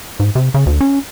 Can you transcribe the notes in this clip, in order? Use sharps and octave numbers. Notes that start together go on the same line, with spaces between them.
G#2
C3
C#3
D2
C#4